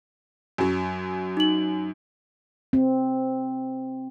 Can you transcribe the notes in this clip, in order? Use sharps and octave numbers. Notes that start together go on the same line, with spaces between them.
F#2 F#3
D#4 F#7
C4